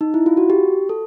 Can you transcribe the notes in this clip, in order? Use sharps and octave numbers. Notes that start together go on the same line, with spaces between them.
D#4
E4
F4
F#4
G4
A4